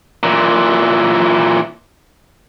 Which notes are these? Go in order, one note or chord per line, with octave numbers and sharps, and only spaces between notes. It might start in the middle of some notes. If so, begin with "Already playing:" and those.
A#2 E3